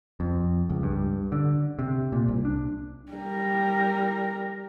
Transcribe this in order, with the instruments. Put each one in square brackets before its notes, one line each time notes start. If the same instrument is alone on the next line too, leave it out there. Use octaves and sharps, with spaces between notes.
[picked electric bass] F2
C#2
G2
D3
C3
A#2
C2
D4
[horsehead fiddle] G3 A#4